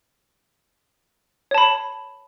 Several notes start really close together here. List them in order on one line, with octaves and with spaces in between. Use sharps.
C#5 A5 B5